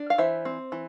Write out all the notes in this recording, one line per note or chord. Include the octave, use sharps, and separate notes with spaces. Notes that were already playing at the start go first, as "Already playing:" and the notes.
Already playing: D4
F5
E3 C5 E5
C4
E3